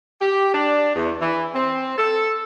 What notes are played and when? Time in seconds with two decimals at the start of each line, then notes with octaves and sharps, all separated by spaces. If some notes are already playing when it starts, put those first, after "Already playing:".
0.20 G4
0.54 D4
0.94 E2
1.20 E3
1.54 C4
1.98 A4